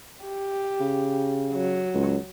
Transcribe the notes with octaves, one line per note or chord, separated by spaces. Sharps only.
G4
C#3
F#3
C#2